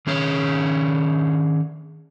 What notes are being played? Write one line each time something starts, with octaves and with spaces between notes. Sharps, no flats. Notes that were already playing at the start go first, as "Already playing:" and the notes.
D#3 C#4 G#4 C#5